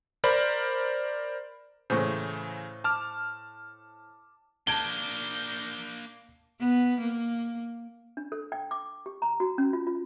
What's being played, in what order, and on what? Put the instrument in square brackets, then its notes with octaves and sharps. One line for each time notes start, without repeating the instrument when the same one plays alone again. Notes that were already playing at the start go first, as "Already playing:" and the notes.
[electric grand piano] A#4 C5 D5 B5
[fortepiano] A2 C5 [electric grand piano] C#3 E3
[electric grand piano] A5 D6 F6
[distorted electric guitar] A#3 D4 [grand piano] A5 G#6 D7 [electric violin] G6 [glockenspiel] G7
[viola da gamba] B3
A#3
[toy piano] D4
A4
G5
D6
G4
A#5
F#4
C#4
F4
F4